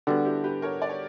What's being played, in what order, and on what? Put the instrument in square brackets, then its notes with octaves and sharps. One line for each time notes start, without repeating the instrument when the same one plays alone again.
[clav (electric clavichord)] D3 G3 B3 [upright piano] D4 F#4
[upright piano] E4 G4
G4 B4
A#4 C#5
D5
C#5